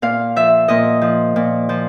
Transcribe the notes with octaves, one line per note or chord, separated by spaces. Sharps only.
A#2 F5
F3 E5
A#2 D#5
F3
A#2
F3